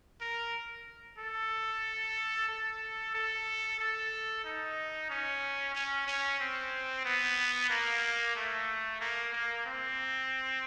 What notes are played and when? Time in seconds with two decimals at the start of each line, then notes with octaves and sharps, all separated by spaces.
0.21 A#4
1.18 A4
2.49 A4
3.15 A4
3.79 A4
4.44 D#4
5.10 C#4
5.75 C#4
6.07 C#4
6.40 C4
7.05 B3
7.70 A#3
8.36 A3
9.01 A#3
9.33 A#3
9.66 C4